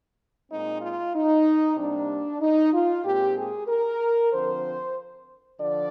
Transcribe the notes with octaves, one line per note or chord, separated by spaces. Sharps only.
A#2 G#3 C4 D#4
F4
D#4
C3 G3 A#3 D4
D#4
F4
A#2 G#3 C4 G4
G#4
A#4
D3 F3 C4 C5
D3 F3 D5